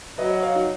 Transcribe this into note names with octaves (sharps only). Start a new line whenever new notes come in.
F#3 B4 D#5
D#5 F#5
C#5 F5
D#4 F#4